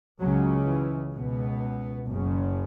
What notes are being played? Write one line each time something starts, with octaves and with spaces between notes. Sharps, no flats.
C#2 C#3 F#3
E3
C#2 B2 B3
F#1 F#2 C#3